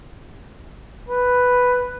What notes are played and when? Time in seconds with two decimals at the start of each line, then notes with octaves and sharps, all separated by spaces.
1.09 B4